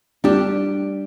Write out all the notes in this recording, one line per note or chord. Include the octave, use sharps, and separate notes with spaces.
G3 D4 G4